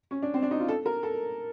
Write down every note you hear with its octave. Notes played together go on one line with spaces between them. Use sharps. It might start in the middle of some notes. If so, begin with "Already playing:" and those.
C#4
D4
C4
D4
D#4
F4
A4
A#4
A4